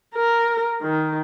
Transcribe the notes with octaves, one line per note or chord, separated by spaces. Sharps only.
A#4
D#3